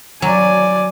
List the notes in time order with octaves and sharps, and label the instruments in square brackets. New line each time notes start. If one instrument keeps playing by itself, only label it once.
[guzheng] F#3 [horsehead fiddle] D5 G#5